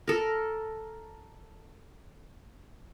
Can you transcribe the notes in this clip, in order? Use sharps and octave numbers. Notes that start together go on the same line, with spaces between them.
A4 A#4